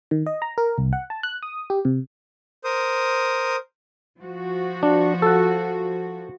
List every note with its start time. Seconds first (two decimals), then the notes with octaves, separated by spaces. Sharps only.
0.11 D#3
0.26 D#5
0.42 A#5
0.58 A#4
0.78 C2
0.93 F#5
1.10 A5
1.23 F#6
1.43 D#6
1.70 G4
1.85 C3
2.64 A#4 C5 D#6
4.20 F3 F#4
4.83 D4
5.22 A4 F#5